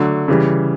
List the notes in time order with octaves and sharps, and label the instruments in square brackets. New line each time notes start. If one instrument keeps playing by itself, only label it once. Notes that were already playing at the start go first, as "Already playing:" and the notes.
Already playing: [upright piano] D3 F#3 A3
C#3 E3 G3